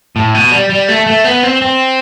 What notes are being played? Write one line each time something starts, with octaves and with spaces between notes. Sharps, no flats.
A2
B2
G3
G3
A3
A3
B3
C4
C4